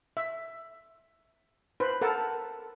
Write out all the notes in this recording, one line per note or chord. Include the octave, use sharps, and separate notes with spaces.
E5
B4 C5
A4 A#4 F#5 A5